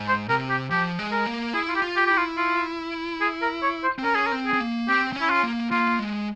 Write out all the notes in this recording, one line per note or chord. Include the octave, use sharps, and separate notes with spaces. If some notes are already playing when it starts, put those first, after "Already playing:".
Already playing: G#2
C5
C3 A#4
G4
F3 G4
G#3
A#4
A#3
E4 G#4
F4
G4
F4
G4
E4 G4
F4
F4
G#4
A#4
C#5
C5
C4
C#4 A#4
G#4
A#4
C4
G#4
C4
A#3
C4 G4
C4
C#4
E4
F4
A#3
A#3 F4
G#3